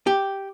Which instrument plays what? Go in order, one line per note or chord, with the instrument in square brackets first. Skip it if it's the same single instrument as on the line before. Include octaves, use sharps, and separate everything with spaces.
[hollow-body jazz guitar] G4